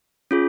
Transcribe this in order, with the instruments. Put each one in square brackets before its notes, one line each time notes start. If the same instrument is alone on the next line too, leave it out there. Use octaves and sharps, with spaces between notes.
[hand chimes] C#4 F4 G#4